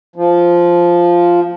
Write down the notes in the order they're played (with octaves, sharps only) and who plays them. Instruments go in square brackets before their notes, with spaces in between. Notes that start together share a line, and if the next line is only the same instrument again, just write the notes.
[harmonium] F3